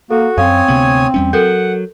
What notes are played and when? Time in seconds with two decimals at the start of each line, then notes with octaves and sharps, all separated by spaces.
0.11 A#3 F#4 A4
0.38 F#2 C4 C#5 F5 G#5 D#6
0.68 D2 C3 B3
1.14 E2 G3 C#4
1.33 F#3 A4 A#4 F#5 G6